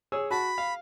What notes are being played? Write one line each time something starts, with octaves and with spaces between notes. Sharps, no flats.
G#4 C#5 E6
F#4 A5 B5
F5